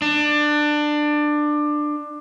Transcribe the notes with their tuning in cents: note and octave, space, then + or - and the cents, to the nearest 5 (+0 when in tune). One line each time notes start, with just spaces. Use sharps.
D4 +20